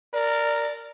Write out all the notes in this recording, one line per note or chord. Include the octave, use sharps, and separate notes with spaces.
A#4 D5